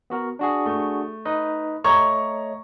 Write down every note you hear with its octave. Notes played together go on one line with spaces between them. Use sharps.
B3 F#4 A#4
D4 F#4 G#4
A3
D#4 B4 D#5
A3 C#5 D#5 A#5 C#6 G#6